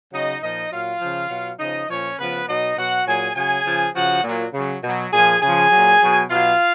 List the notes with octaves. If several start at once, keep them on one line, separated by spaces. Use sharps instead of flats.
C#3 F#3 D#4 D#5
A#2 F3 D#4 D#5
A#2 F#3 F4 F5
C#3 F3
B2 F#3
C#3 F3 D#4 D#5
A#2 F3 C#4 C#5
C#3 F3 B3 B4
B2 F#3 D#4 D#5
B2 F#3 F#4 F#5
A#2 F#3 G#4 G#5
C#3 F#3 G#4 G#5
C#3 F3
C#3 F3 F#4 F#5
A#2 F#3
C#3 F#3
B2 F#3
A#2 F3 G#4 G#5
C#3 F3 G#4 G#5
A#2 F#3
B2 F#3
B2 F#3 F4 F5